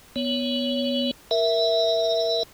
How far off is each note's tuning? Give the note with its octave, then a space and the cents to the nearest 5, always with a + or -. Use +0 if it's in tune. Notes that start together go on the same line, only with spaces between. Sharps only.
B3 +0 C#5 +15
A#4 +0 E5 +0